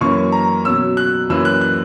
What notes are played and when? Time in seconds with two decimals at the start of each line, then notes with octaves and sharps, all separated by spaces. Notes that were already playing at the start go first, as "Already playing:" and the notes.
0.01 F#2 E3 A#3 C#4 C#6
0.32 A#5
0.64 B2 F#3 C#4 E6
0.97 F#6
1.30 F#2 E3 A#3 C#4 E6
1.45 F#6
1.61 F#6